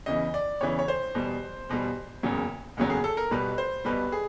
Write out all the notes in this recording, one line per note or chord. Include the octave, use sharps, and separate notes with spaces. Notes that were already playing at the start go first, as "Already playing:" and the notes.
E2 C#3 E3 D#5
D5
E2 C#3 E3 C#5
C#5
C5
E2 B2 G3
E2 B2 G3
F#1 E2 C#3 F#3
F#1 E2 C#3 F#3
G#4
A4
A#4
B1 B2 G3 B4
C5
B1 B2 G3 B4
G#4